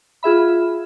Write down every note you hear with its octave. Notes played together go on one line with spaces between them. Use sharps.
F4 G#4 E5 B5